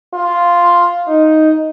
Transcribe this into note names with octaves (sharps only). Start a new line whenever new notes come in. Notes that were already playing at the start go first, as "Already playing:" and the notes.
F4
D#4